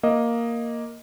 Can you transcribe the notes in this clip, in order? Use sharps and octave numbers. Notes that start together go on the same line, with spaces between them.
A#3 D#5